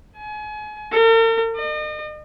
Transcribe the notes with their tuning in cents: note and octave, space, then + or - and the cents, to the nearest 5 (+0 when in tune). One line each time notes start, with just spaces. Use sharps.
G#5 +35
A#4 -45
D#5 -40